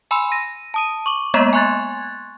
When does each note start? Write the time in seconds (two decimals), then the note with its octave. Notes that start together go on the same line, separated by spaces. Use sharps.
0.11 G#5 B5 C6 E6
0.32 A#6 D#7
0.74 A5 D#6 D#7
1.06 C#6 D6 F#7
1.34 G#3 A#3 B3 D#5 A#5 E7
1.53 G#5 C6 C#6 F#6 G#6 A6